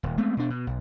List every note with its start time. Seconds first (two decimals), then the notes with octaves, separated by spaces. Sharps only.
0.03 D#1
0.18 G#3 A3 B3 C4
0.37 B2 D4
0.50 B2
0.67 B1